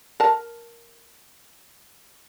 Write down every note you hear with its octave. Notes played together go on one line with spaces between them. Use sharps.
A#4 A5